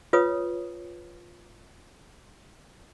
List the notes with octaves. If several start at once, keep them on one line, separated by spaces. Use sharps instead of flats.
F4 B4 C#5 D#6